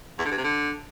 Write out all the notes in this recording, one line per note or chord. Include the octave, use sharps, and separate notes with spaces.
E2
D3
G2
C3
D3